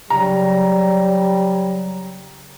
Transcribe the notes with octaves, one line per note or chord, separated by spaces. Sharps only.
C#3 F#3 G3 A#5